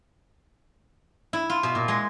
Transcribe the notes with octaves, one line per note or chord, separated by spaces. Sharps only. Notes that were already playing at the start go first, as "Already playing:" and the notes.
E4
F4
B2
A#2
G#3